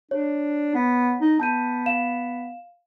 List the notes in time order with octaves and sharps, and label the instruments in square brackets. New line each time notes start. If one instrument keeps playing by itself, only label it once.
[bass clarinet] D4 [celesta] C#5
[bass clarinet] B3
D#4
[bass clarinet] B3 [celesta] A5 G6 D#7
[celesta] F5 E7